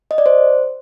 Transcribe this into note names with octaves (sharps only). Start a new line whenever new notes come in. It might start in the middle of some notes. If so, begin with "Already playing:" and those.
D#5
D5
C5